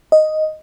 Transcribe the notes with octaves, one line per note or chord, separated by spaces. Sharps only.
D#5